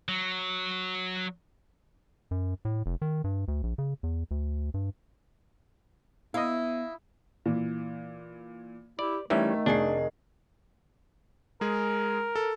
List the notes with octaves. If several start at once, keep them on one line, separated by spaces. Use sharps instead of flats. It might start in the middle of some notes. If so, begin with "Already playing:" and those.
F#3
F#2
A2
F1
D#3
G2
D2
A#1
C#3
E2
D2
G2
B3 E4 D#5 F5
A#2 E3
E4 G4 D5
D#3 E3 G3 A3 C#4 E5
F1 D4 G#4 C7
G#3 G#4 A#4
A4